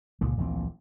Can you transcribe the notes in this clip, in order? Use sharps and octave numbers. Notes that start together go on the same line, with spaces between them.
C#2 A#2 G#3
D1 A#1 E3 C4